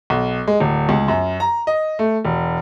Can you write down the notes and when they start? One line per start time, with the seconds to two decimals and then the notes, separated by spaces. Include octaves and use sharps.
0.10 B1
0.47 G#3
0.60 D1
0.89 C#2
1.08 F#2
1.40 A#5
1.67 D#5
1.99 A3
2.25 E1